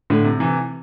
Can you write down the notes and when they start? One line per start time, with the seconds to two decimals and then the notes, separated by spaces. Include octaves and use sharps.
0.10 A2 D3
0.25 C3
0.40 C3 E3